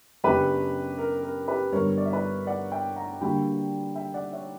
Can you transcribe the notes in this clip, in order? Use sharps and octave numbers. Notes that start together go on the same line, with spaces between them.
F#2 C#3 F#3 B3 D4 G4 B4
A#4
A#4
G4 B4
G2 D3 G3 B3 A#4 C#5
D5
E5
B4 D5
D5 F#5
E5 G5
F#5 A#5
D3 G3 A#3 D4 F#4 G5 B5
E5 G5
D5 F#5
C#5 E5